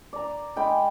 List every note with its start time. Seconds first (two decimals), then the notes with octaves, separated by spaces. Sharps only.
0.13 D5 A#5
0.56 G#3 G5 B5